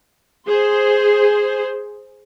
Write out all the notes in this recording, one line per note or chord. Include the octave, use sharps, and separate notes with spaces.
G#4 C5